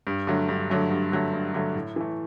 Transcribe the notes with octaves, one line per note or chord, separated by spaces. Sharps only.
G2
D3 F#3 A3
G2
D3 F#3 A3
G2
D3 F#3 A3
G2
D3 F#3 A3
A2
E3 A3